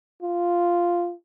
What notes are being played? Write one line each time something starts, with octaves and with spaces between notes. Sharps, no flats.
F4